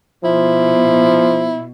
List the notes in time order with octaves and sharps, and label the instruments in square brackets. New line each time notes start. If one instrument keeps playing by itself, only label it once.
[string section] B2 [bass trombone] F3 [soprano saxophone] E4